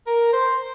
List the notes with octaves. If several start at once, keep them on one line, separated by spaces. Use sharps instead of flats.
A#4
C5